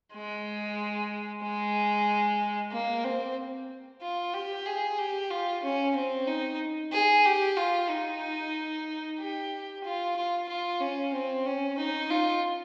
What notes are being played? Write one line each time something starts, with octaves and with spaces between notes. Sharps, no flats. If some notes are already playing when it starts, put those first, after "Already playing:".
G#3
G#3
A#3
C4
F4
G4
G#4
G4
F4
C#4
C4
D#4
G#4
G4
F4
D#4
G4
F4
F4
F4
C#4
C4
C#4
D#4
F4